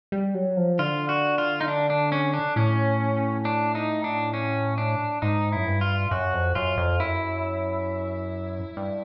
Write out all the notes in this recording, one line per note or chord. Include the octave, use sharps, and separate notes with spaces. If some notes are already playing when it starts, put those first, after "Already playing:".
G3
F#3
F3
D3 F4
F#4
F4
D#4
D4
D4
C#4
D4
A2 C#4
D4
D#4
D4
C#4
D4
G#2 D#4
F#2 E4
G2
F4
F#2 F#4
F2
F#2 F4
F2
F#2 E4
G2